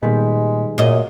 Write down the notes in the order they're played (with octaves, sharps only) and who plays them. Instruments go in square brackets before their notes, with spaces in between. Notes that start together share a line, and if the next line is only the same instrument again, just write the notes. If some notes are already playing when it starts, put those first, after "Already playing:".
[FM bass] A#2 [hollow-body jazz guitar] D#3 G3 B3 [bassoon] G#3
[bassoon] F#2 [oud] A#2 D#5